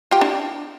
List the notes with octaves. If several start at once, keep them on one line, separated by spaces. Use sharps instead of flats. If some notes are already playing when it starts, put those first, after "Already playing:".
F4 G4
D4 E4